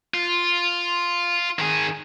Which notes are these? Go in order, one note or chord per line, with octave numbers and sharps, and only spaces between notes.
F4
D#3 G#4